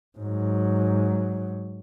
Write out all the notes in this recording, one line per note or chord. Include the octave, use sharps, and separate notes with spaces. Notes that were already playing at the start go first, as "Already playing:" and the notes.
G#2 F#3